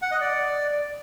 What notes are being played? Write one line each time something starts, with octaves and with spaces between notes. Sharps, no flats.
F#5
D#5
D5